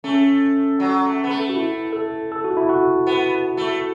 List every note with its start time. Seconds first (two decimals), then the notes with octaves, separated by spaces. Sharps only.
0.04 A3 C#4
0.80 F#3
1.05 A3
1.24 B3
1.30 A3
1.49 F#4
1.56 E4
1.93 A4
2.32 A4
2.44 F#4
2.57 E4
2.69 F#4
3.07 B3
3.57 A3